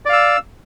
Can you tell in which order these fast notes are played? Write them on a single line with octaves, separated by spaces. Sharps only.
D5 F5 E6